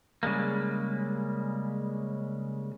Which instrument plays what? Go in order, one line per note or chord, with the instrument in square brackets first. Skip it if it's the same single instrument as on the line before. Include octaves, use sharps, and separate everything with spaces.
[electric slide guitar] C#3 G3 G#3 A#3